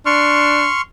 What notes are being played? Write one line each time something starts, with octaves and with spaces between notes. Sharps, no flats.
D4 C6 C#6 F6